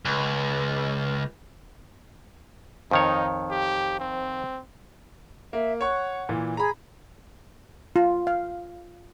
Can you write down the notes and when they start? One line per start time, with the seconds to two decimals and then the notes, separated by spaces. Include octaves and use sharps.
0.05 C#2
2.91 F2 D#3 D#4 C#5
3.51 G4
4.00 C4
5.53 A#3 E5
5.81 C#5 F#5 C#6
6.29 A#2 E3
6.57 G#4 A#5 B5
7.96 F4
8.27 F5